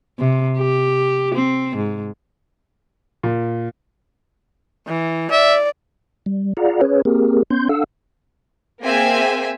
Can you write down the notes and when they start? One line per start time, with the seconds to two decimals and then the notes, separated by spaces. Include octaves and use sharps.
0.19 C3
0.57 G4
1.35 C4
1.76 G#2
3.23 A#2
4.88 E3
5.31 D5 E5
6.26 G3
6.57 F4 G#4 D5 F5 F#5 A#5
6.81 C#4 G#4 B4 C#5
7.05 A#3 C4 G4 G#4 A#4
7.50 B3 C#4 C6 G6
7.69 D4 A4 F5 F#5 E6
8.82 A#3 C4 G#4 E5 G#5